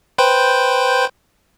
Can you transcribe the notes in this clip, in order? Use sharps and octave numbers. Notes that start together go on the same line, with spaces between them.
B4 C5 G5